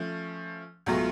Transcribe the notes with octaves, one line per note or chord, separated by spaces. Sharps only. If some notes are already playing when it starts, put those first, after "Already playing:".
Already playing: F3 A3 C#4
C#2 B2 F#3 A3 F4